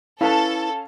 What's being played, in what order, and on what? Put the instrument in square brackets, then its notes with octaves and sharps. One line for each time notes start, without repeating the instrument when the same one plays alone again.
[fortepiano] C#4 F5 [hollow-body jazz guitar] E4 B4 A5 [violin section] A4